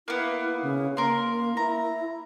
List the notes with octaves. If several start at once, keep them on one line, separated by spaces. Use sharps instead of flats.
A#3 B3 E4
C#3
A#3 A#4 C6
E4 A#5